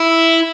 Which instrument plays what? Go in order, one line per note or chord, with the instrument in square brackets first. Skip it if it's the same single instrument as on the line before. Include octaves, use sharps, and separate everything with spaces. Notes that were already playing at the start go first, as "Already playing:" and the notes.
Already playing: [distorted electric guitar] E4